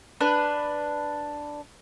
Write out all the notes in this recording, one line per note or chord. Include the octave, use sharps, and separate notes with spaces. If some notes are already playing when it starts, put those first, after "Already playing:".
D4 B4